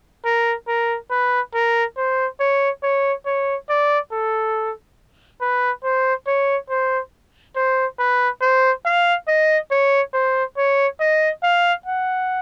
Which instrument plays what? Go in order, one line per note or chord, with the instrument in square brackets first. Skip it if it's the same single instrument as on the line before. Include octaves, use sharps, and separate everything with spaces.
[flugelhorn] A#4
A#4
B4
A#4
C5
C#5
C#5
C#5
D5
A4
B4
C5
C#5
C5
C5
B4
C5
F5
D#5
C#5
C5
C#5
D#5
F5
F#5